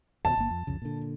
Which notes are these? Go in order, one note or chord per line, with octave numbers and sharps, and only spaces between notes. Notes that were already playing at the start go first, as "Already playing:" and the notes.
D#2 B2 A5
G1 A#3
F2
C2 F2 C#3
A#2 D3